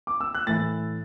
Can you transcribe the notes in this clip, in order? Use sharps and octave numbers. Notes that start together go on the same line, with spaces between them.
D6
E6
F#6
A2 E3 A6